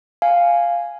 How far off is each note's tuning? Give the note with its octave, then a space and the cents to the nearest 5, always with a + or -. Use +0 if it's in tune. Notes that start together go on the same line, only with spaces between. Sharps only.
F5 +0 G#5 +0